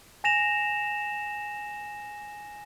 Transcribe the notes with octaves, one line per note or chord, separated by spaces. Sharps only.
G#5 A#6 E7 F7